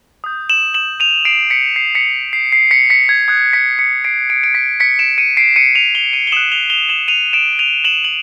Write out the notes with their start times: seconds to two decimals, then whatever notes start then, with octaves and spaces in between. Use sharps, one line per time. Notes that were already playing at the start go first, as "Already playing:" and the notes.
0.24 D#6 G6
0.50 E7 F#7
0.74 E7 F#7
1.00 D#7 F7
1.25 C7 D7
1.50 B6 C#7
1.76 C7
1.95 B6 C#7
2.33 C7
2.52 C7
2.71 B6 C#7
2.90 B6 C#7
3.09 G#6
3.28 D#6 F#6 G#6
3.53 B6 C#7
3.79 B6 C#7
4.04 C7 D7
4.30 C7 D7
4.44 D7
4.54 B6 C#7
4.80 B6 C#7
4.99 D7 E7
5.18 C#7 D#7
5.37 C7 D7
5.56 C#7 D#7
5.75 D#7 F7
5.95 F7 G7
6.13 D#7 F7
6.27 G7
6.32 D#6 F#6 E7 F#7
6.52 F7 G7
6.70 F7 G7
6.89 E7 F#7
7.08 D#7 F7
7.33 D7 E7
7.59 D#7 F7
7.84 E7 F#7
8.05 F#7